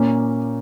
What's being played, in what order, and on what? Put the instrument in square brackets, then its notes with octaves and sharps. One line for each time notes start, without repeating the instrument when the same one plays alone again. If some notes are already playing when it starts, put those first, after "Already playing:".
Already playing: [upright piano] A#2 A#3 C#4